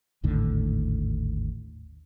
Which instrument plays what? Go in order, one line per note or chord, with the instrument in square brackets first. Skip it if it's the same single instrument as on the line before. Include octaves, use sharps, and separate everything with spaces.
[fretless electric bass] G#1 D#2 A2 D3